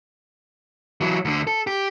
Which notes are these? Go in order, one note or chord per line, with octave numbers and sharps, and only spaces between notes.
E3 F#3
D2 D3
A4
G4